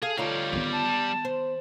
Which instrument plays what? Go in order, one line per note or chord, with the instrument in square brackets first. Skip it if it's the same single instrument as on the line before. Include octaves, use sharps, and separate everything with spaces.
[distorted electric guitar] G#4 [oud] A4 [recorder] F5
[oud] D2 D#4 F4 [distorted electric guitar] G3 F5 [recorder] C#5
[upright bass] D#3 B3
[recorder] A5
[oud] C5